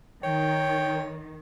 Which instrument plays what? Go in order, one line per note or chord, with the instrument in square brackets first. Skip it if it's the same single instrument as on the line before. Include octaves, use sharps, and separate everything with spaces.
[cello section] D#3 [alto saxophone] C#5 [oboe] G5